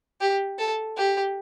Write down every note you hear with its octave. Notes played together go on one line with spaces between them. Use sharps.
G4
A4
G4